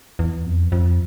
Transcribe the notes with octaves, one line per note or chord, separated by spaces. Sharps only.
E2
F2
F2